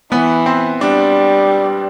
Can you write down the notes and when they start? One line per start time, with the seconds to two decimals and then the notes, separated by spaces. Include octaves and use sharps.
0.12 E3 B3
0.46 C4
0.81 G3 D4